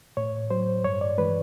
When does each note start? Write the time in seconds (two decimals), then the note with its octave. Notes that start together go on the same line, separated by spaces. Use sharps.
0.17 A2 C#5
0.51 F#3 C5
0.84 G2 C#5
1.01 D5
1.18 E3 G#3 B4